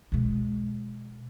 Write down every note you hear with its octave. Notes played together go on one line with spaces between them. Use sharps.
B2 G#3